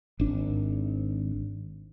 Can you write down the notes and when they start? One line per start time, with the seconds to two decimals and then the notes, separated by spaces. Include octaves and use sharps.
0.20 G#1 D4